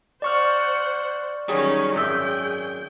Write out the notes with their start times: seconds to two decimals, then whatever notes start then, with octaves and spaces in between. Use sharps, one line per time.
0.22 C5 D5 F#5 C#6 F6
1.48 D#3 F#3 G3 C#4 G#4
1.95 G#1 F#2 G#4 E5 G5